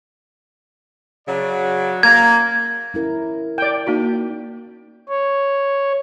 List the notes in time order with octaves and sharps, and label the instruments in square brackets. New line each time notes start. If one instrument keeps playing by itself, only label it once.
[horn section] C#3 F#3 D5
[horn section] A#3 [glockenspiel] G#6
[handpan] C#4 E4 A#4
[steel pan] D5 G5
[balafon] A#3 D#4 F#4
[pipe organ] C#5